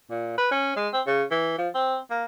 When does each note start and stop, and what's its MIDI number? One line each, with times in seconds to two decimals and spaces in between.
0.11 0.38 46
0.38 0.51 71
0.52 0.76 61
0.77 0.89 56
0.93 1.02 60
1.06 1.24 49
1.31 1.54 52
1.58 1.69 53
1.75 1.98 60
2.11 2.25 58